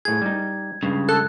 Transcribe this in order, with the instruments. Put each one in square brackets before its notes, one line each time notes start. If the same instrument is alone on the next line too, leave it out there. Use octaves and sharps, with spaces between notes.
[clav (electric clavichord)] A2 G#4 [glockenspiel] G#6
[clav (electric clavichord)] G3 D#4
[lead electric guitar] C#2 C#3 [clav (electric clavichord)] G2
[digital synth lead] A4 [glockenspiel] F#6